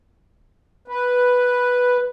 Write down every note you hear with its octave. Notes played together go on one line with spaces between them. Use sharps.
B4